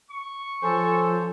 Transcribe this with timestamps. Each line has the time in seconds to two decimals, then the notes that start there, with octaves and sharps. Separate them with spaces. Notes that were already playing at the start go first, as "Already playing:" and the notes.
0.10 C#6
0.62 F3 C#4 A4 C5